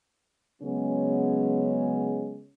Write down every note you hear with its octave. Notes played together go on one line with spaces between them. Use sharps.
C#3 F#3 G#3 B3 C#4